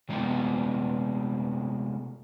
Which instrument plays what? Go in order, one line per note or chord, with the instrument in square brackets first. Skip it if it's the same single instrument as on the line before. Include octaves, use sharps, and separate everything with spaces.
[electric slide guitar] C3 G#3 A3 B3